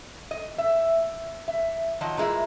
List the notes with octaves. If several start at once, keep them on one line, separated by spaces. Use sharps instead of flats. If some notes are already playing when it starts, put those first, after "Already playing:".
D#5
E5
E5
D#3 F3 F#3 F#4 D#5 A5
A#2 E3 G#3 E4